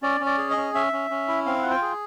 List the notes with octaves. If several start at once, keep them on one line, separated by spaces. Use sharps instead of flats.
C#4 D5
C#4
D5
G#4
D#5
C#4
C#4 E5
C#4
C#4
E4
C4 F5
F4 F#5
G5
G#4